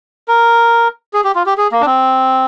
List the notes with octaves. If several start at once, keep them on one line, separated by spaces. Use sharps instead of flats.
A#4
G#4
G4
F4
G4
G#4
A#3
D4
C4